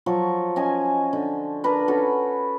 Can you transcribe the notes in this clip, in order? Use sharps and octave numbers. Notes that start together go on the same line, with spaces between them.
F3 F#3 C#6
C#4 D#5 G#5
D3
D4 A#4 B4
C#4 F#4 A4